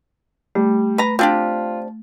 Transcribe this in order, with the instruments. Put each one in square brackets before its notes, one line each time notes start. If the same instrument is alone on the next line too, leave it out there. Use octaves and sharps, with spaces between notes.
[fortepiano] G3 [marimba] A3
[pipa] B4 A#5
[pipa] C4 D4 G4 [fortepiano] F4